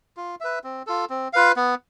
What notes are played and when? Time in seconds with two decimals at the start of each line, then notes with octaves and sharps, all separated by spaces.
0.17 F4
0.40 B4 E5
0.64 C4
0.87 F4 A4
1.10 C4
1.33 F4 B4 F5
1.56 B3